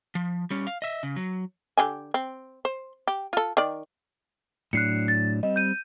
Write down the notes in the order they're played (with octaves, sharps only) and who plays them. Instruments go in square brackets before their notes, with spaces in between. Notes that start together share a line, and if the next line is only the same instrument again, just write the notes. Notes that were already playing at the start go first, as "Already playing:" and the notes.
[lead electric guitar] F3
G3 C#4
F5
D#5 E5
C#3
F#3
[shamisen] D3 G4 G#5
C4
C5
G4
F4 A4
D#3 D5
[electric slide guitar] A2 F#3 D4 [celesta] F#6 C7 C#7
[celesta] A6
[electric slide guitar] G3 C4 [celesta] D#5
[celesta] G6 D#7